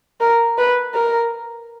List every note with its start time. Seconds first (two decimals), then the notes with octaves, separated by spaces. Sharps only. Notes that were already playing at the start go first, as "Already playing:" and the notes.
0.21 A#4
0.59 B4
0.95 A#4